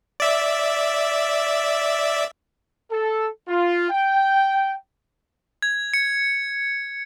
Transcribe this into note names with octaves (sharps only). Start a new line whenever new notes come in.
D5 E5
A4
F4
G5
G#6
C#7